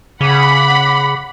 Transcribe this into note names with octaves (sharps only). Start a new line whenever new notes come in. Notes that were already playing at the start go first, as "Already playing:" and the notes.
C#3 F#5 B5 D6